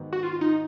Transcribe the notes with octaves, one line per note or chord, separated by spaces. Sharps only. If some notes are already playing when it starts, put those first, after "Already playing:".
Already playing: G#2 D#3 F#3 B3
F#4
F4
D#4